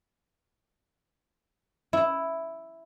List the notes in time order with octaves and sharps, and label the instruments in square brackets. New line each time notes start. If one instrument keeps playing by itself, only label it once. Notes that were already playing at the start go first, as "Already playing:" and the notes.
[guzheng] E4